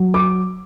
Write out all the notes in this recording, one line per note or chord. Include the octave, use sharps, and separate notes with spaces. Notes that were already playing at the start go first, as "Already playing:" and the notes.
Already playing: F#3
D6